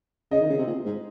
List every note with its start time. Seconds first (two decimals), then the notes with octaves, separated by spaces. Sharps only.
0.31 C#3 D#5
0.41 D#3
0.50 C#3
0.58 C3
0.67 A#2
0.85 G#2